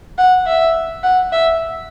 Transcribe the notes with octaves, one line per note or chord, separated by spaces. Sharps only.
F#5
E5
F#5
E5